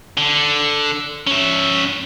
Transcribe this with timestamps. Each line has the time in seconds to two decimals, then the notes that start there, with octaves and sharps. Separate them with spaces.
0.17 D3
1.27 C#4 E5